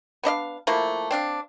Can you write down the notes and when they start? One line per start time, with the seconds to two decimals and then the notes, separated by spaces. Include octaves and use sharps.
0.23 B3 D4 D#5 F5
0.67 F3 A3 A#3 E4
1.11 C4 D4 F5